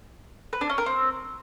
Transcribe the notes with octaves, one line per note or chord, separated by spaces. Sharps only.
B4
D4
C#4
A#4
C4